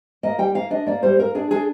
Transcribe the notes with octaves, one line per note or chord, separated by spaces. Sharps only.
A#3 D#5
G3 G5
A#3 F5
D4 D#5
A#3 D5
G3 C5
A#3 A#4
D4 G#4
D4 G#4